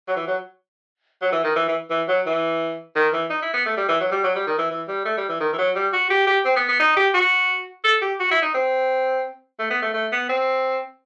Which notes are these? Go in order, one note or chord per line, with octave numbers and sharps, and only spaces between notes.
F#3
E3
F#3
F#3
E3
D#3
E3
E3
E3
F#3
E3
D#3
E3
D#4
E4
B3
A3
G3
E3
F#3
G3
F#3
G3
D#3
E3
E3
G3
A3
G3
E3
D#3
E3
F#3
G3
F#4
G4
G4
C4
B3
B3
D#4
G4
F#4
A4
G4
F#4
E4
D#4
C4
A3
B3
A3
A3
B3
C4